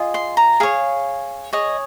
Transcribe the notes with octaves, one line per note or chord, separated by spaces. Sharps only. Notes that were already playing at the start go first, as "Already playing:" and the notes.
Already playing: F4 G#4 D#5
C6
A#5
G#4 C#5 F5
G#4 C#5 D#5